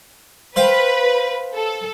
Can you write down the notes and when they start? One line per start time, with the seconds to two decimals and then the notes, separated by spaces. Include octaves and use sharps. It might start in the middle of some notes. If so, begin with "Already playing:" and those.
0.56 B4 C5 F5 G5
1.53 A4